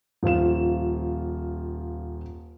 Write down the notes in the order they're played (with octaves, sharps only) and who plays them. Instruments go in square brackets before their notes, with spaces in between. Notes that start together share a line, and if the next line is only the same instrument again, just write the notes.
[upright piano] D#1 F3 F4 E7